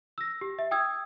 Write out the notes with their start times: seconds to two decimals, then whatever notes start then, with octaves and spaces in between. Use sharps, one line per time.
0.18 E6 A#6
0.41 G4
0.59 E5
0.71 G5 D#6 E6 G#6